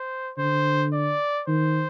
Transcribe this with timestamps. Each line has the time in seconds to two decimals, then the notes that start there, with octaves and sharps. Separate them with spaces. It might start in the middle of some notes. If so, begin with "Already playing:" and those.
Already playing: C5
0.38 D3 C5
0.93 D5
1.48 D#3 C5